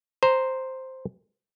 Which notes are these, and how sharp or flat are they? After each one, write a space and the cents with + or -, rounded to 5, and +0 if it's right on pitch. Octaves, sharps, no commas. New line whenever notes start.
C5 +0 A#5 +0